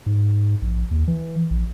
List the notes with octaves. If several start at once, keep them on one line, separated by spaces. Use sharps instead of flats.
G#2
A#1
D#2
E3
A#1